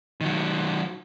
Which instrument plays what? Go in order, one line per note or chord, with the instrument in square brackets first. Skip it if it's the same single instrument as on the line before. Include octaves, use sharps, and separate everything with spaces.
[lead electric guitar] D#3 F#3